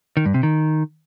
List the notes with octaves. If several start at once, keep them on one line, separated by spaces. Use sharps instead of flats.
D#3
G2
C3
D#3